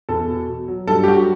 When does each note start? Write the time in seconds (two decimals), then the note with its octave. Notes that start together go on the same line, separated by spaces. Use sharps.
0.09 E2 A4
0.29 B2
0.48 B2
0.68 F#3
0.87 G2 A4
1.04 G4
1.08 F#3 F#4